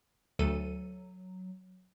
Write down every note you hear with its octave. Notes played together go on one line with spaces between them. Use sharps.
D2 F#3 A4 D#7